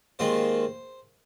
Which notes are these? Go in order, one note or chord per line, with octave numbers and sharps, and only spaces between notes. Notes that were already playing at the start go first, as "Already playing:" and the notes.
D#2 D#3 G#3 C4 F4 C5